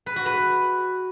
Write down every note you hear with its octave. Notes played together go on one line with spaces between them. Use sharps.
B4
F#4
B4